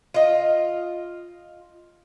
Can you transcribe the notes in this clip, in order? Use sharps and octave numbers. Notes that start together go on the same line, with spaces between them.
F4 D#5